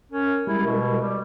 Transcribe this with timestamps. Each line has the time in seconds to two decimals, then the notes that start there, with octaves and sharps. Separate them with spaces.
0.12 C#4 A#4
0.47 G3 G#3 E4
0.66 B2
1.01 G3